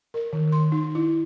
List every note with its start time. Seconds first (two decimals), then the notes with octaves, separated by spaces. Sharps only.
0.14 A#4
0.33 D#3
0.52 C6
0.72 D#4
0.95 E4